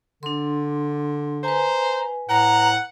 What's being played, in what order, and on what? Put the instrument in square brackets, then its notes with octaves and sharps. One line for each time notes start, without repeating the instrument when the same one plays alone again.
[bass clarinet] D3 [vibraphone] D4 C6
[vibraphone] B4 G#5 [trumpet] C5 [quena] A#5
[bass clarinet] A2 [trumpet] F#5 [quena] A#5